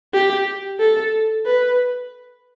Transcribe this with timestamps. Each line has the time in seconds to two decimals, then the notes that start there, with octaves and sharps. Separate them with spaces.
0.13 G4
0.80 A4
1.46 B4